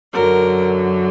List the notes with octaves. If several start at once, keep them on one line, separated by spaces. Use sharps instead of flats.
F#2 D3 F#3 A#4